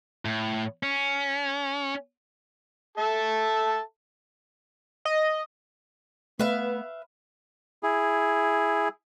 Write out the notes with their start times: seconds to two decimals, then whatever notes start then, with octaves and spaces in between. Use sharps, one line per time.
0.25 A2
0.83 C#4
2.98 A4 E5 A5
5.05 D#5
6.39 A3 B3 B4 E5 F5
7.83 E4 G#4